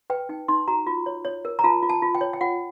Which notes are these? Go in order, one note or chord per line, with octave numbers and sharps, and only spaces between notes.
B4 G5
D#4 G5
D#4 C6
F#4 A#5
F4
C#5
C#5
A#4
A#5
F4 A5
F4
A5
F4
G5
C#5
G5
F4 F#5